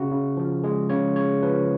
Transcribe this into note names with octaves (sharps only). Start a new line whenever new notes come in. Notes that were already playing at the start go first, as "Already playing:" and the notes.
Already playing: C#3 F#4
C#3
F3
G#3 G#4
C#3 C#5
C#3 C#5
F3 B4